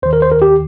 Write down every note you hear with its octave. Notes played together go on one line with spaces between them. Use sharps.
D#2 D#3 C5
A#4
C5
A#4
G4